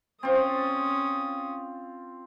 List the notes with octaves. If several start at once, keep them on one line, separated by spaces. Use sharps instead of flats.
C4 C#4 F4 D#6